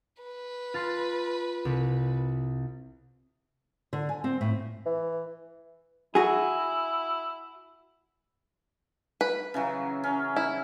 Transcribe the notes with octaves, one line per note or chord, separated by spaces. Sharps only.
B4
F4 A5 C6
C2
D3
G#5
C4
A2
E3
E4 F#4 G#4
B4
C#3 E3 F#3
C#4
E4